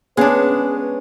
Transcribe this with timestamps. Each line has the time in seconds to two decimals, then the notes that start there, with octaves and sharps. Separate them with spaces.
0.17 G#3 B3 C#4 D4 G#4 B4 F5